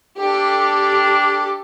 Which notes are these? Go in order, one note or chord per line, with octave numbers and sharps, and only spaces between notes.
D4 G4 A4